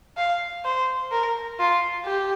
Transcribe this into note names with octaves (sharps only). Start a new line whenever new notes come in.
F5
C5
A#4
F4
G4